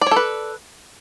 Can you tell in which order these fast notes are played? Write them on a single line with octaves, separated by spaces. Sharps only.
D5 C#5 A4 B4